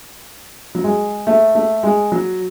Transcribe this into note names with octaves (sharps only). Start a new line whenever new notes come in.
F#3
G#3
A3
A3
G#3
F#3